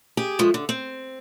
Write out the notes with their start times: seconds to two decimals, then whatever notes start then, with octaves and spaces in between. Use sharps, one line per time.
0.17 G4 G#4
0.39 F3 G#3 A3
0.54 D3
0.69 C4